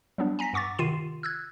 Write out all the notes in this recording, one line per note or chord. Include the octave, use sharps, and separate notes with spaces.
F#3 G3 B3 D4
G#5 A#5 A#6 B6
G2 F#5 C#6 D6 A6
C3 D#3 F4 C7 D#7 E7
E6 F#6 G#6